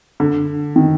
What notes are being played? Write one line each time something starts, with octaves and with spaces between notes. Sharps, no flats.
D3
D#3